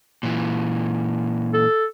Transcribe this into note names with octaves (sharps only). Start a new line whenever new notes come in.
A#2 E3
A4